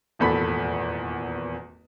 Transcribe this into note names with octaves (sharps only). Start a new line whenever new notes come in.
D#1 G#1 E2 A4 B5 B6